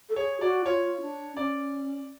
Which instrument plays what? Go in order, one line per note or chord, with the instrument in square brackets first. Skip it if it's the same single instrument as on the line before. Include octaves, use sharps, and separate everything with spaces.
[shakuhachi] A4
[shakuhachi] G#4 [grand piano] C#5
[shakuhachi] F#4 [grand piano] D5
[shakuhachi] F4 [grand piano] C#5
[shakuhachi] D4
[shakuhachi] C#4 [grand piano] D5